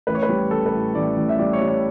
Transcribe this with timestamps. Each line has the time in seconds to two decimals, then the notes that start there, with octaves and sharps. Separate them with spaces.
0.07 A1 B4
0.15 C#5
0.23 B4
0.29 G3
0.51 A1 A4
0.66 B4
0.73 A2
0.95 A1 D5
1.17 A1
1.29 E5
1.39 G3 D5
1.53 C#5
1.61 G3
1.68 C#5